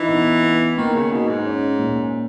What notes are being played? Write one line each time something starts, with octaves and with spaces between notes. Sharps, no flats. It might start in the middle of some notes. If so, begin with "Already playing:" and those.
Already playing: E3 D#4
B3
B3
D#3 A#3
C#3
B2 D#4
G#2
C#4
A#2